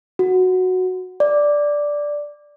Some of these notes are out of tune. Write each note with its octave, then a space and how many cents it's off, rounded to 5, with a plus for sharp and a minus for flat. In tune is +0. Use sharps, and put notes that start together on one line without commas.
F#4 -5
D5 -5